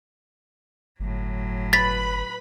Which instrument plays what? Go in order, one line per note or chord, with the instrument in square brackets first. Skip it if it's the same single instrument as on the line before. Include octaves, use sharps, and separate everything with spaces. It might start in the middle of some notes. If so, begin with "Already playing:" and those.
[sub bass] G1 [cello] A2 F#3
[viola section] B4 B5 [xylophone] A6 B6